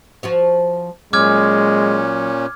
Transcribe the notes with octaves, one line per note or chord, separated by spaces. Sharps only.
F3 F#4 C#5
A#2 F#3 G#3 C#4 D6 F6 G#6